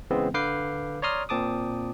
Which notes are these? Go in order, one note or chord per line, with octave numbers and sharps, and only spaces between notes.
C#3 E3 G#3 B3 C4
D3 B4 F5 D6 G6 C7
C#5 D5 A#5 C6 D#6 F6
A#2 C4 A5 D6 D#6